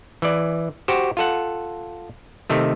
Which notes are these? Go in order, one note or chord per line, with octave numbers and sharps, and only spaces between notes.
E3 D5
F#4 G4 C5
F4 A4 F#5
C3 D#3 A3